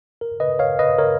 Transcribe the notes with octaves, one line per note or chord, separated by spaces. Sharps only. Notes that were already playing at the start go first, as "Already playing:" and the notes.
A#4
B4 D#5
C#5 F5
B4 D#5
A#4 C#5